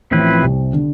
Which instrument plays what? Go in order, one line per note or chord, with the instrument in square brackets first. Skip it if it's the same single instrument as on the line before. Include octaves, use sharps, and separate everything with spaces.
[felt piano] A1 A2 [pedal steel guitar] F3 C4 E4 B4
[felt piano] C2 C3
D3